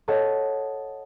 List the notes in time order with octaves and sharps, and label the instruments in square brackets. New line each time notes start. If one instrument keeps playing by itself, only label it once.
[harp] A4 C#5 D#5 F#5 A5